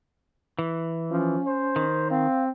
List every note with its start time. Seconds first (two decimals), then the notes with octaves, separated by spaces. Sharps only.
0.59 E3
1.11 F3 C#4
1.47 C5
1.76 D#3
2.10 C4 F5